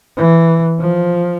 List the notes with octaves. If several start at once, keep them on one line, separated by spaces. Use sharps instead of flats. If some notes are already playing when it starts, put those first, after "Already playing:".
E3
F3